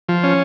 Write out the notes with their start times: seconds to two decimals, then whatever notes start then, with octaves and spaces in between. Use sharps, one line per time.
0.09 F3
0.23 C#4